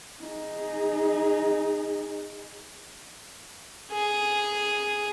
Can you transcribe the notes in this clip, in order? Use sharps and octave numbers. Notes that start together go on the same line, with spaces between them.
D#4 G#4
G#4